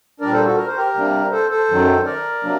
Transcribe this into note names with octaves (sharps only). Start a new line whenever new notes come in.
A#2 G3 D4 A#4 D5
A4 C5
F#4 A4
A#4
C5
G4 A#4
C3 G3 A#3 D4
A4 C5
A4 C5
F#2 D#3 F#3
A#4 D5
C3 F#3 A#3 D4